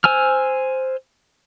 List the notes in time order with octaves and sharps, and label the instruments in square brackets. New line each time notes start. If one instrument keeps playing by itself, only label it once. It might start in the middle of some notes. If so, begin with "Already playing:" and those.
[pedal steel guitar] C5 G#5 E6 F6